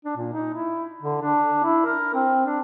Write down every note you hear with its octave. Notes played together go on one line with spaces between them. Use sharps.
D4
A#2
D#4
E4
D3
D4
E4
A#4
C4
D4